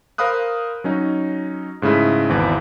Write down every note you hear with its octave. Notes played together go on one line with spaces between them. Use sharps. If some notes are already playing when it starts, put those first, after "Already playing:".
A#4 C5 F5 B5 D#6 F#6
F#3 C#4 D#4
G#2 C#3 A3 E4
G#1 E2 E3 B4 A5